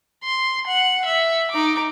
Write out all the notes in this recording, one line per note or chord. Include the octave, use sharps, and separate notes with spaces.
C6
F#5
E5
D#4 D6